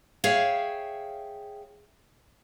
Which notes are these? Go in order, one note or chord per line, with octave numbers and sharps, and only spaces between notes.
G#4 C#5 E5 F5 G5